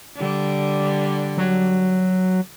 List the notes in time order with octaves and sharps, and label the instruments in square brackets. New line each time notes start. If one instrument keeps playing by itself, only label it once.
[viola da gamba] D3 G3
[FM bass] F#3